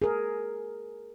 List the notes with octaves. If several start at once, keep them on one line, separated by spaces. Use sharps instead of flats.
G#4 A#4